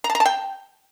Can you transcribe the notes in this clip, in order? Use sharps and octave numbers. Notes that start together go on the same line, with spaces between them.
A#5
A5
A#5
A5
G5